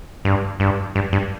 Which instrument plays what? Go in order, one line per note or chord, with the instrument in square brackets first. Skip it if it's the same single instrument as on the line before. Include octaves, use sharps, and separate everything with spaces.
[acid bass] G2
G2
G2
G2